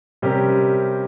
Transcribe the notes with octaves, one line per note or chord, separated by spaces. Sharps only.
C3 G3 C#4 G4 A#4